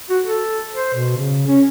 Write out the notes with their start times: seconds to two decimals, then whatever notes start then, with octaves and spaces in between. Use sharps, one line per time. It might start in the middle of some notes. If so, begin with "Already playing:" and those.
0.10 F#4
0.24 A4
0.74 C5
0.95 B2
1.16 C#3
1.47 C#4